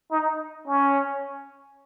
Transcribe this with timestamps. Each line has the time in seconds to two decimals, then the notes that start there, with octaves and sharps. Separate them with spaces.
0.11 D#4
0.67 C#4